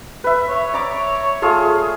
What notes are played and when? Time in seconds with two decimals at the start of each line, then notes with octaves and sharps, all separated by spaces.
0.24 B4 E5
0.49 C#5
0.74 D5 A#5 D6
1.42 A3 F4 G#4